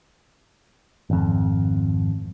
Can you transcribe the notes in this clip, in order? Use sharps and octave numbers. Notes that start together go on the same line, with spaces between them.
G#1 F2